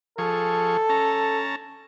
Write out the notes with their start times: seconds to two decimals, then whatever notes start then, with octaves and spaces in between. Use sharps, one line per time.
0.18 F3 G#4 A4 C#6
0.89 C#4 A5 A#5